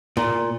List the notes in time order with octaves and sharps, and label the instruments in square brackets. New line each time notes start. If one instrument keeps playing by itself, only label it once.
[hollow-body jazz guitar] A#2